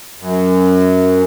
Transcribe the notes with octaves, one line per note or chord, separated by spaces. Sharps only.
F#2